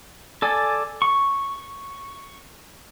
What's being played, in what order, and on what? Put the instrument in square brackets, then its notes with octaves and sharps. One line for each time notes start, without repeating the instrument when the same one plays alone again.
[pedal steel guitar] A4 D5 G#5
C#6